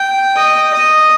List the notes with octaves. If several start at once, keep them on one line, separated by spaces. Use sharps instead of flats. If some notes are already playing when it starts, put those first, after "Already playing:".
Already playing: G5
D#5
D#5